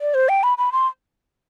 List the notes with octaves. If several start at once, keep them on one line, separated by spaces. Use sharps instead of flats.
D5
C5
G5
B5
B5
C6